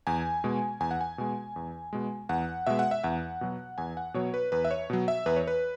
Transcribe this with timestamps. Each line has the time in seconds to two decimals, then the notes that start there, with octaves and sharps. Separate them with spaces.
0.07 E2 G#5
0.44 B2 G#3
0.80 E2 G#5
0.91 F#5
1.01 G#5
1.18 B2 G#3
1.56 E2
1.93 B2 G#3
2.29 E2 F#5
2.67 B2 G#3 E5
2.79 F#5
2.91 E5
3.03 E2 F#5
3.41 B2 F#3
3.78 E2 G#5
3.97 F#5
4.14 B2 F#3 C#5
4.34 B4
4.52 E2 B4
4.65 E5
4.71 C#5
4.90 B2 F#3
5.08 E5
5.26 E2 B4
5.36 C#5
5.47 B4